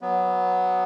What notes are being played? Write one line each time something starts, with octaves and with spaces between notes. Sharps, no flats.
F#3 B3